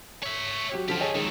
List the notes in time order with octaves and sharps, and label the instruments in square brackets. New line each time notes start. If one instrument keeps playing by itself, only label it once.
[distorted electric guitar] C#5 E5
[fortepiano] F#3 G4
[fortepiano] D3 F3 [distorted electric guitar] G4 A4
[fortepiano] G#4 C#5 D#5
[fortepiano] D#3 G#3 [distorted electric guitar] F#3 A4